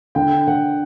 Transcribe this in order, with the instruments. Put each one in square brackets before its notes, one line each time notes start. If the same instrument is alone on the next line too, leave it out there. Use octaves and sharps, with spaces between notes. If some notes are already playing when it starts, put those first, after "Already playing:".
[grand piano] D3 G5
D3 F#5